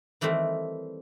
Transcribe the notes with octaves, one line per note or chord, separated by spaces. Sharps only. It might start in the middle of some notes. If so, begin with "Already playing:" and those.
D#3 E3 G3 A3 C4